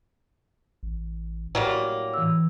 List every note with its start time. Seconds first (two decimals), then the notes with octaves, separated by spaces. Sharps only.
0.83 A1
1.55 A2 F#3 G3 A#3
2.14 E3 E6